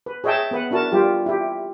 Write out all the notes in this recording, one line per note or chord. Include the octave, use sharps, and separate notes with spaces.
B4
G#4 C#5 D#5 E5 G5 A5
B3 B4 F#5
D4 E4 F#4 A#4 A5
G3 F4 G4
E4 G4